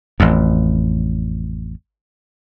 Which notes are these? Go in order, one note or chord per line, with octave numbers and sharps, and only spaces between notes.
A1 F2